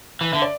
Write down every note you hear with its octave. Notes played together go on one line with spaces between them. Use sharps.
E3
D3 E5
D5